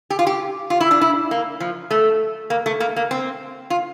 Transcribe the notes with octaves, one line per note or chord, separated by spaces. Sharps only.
G4
F4
G4
F4
E4
D4
E4
A#3
F3
A3
A#3
A3
A#3
A#3
C4
F4